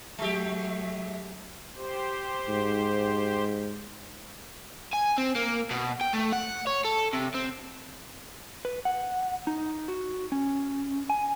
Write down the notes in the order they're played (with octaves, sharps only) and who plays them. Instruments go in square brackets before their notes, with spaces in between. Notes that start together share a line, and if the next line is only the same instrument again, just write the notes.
[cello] F#3 A3 [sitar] G#3 G4 [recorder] E5
[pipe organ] G4 C5
[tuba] G#2
[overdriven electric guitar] G#5
C4
A#3
B2
G5
A3
F#5
C#5
A4
C3
C4
[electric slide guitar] B4
F#5
D#4
F#4
C#4
G#5